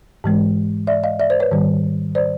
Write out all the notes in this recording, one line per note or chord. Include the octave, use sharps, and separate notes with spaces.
G#2 E3 G#3
D5 E5
D#5 F5
D5 E5
C5 D5
B4 C#5
G#2 D#3 G3
C5 D5